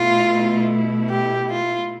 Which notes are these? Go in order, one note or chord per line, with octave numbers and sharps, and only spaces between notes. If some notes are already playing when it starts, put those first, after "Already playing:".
Already playing: B2 A3 E4 F4
G4
F4